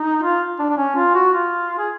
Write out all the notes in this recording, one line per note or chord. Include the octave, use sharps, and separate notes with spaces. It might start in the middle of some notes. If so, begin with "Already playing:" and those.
Already playing: D#4
F4
D4
D4
C#4
F4
F#4
F4
G#4